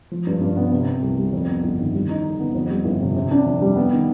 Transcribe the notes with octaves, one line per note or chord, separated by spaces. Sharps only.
F3
G2
G2
B3
C3
C4
C2
G3
F2
B3
G1
D#3
G3
D#4
D3
B3
F2
G3
G1
C3
C3
D4
F2
G3
B3
D#3